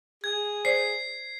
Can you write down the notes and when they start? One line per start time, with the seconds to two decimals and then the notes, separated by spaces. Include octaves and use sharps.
0.24 G#4 G#6
0.65 C5 D5 C7